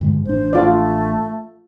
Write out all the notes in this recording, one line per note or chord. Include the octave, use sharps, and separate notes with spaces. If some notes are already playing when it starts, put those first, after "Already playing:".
G2 D3 G#3
A1 D4 C5
A3 F4 D5